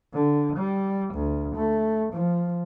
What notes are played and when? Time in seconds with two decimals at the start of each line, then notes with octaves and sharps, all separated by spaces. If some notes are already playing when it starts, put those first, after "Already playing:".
0.13 D3
0.56 G3
1.14 D2
1.55 A3
2.13 F3